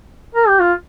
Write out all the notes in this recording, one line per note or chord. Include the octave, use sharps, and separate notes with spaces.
A#4
G4
F4